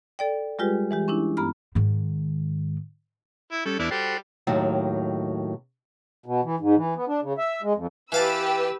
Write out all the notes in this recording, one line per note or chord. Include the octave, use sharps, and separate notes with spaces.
A4 D5 G5
G3 G#3 F4 G4 G#4 B4
E3 G#3 G4
C#4 D4 E4
G2 B3 A#5 B5 F6
G#2 D#3
E4
G3 C#4 A4
E2 B3 D4 E4 D5 F6
G3 F#4 G4 A4 C5
D#2 A2 D#3 F#3
B2
E3
G#2
E3
B3
D4
C#3
E5
G#3
F2
E3 G4 B4 F5 A5 E6